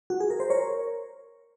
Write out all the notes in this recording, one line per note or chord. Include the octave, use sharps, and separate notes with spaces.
F#4
G#4
A#4
C5
A#4 C#5